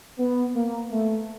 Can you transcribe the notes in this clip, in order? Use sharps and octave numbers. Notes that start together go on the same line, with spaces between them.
B3
A#3
A3